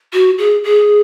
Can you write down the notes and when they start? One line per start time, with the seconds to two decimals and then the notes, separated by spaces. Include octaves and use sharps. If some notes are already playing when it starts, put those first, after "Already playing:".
0.13 F#4
0.38 G#4
0.64 G#4